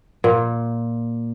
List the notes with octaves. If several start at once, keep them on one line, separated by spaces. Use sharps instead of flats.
A#2